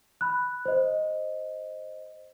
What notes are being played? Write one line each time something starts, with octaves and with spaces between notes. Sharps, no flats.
B5 F#6
C5 D#5